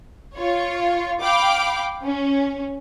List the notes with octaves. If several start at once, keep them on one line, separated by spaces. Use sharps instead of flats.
F4 C#5
F5 G5 B5 D6
C#4